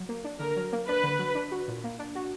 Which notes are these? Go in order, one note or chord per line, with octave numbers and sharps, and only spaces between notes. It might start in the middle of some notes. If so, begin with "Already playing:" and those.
Already playing: F#3
A#3
D4
D3 A#4
F#3
A#3
D4 B4
D3
F#3
D4
F#4
A#2
A#3
D4
F#4